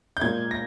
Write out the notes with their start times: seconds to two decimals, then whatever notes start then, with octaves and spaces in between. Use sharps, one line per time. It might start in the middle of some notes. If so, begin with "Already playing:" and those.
0.17 G6
0.21 A#2 G#3 G#6
0.51 A#6